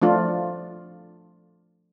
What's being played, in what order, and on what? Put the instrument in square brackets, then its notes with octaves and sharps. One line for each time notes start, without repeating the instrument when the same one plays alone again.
[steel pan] F3 A3 D4 F4